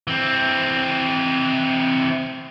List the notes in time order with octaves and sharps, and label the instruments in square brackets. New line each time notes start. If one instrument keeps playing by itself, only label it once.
[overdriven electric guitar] E3 C4